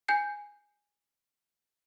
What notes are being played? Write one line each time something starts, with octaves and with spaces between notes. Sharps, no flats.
G#5 G6 C7